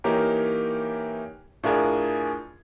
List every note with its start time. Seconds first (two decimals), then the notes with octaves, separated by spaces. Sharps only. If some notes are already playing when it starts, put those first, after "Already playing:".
0.04 E3 A#3 D#4 G4 A#4 C#5
1.63 A2 D4 F4 G#4 A#4 G#6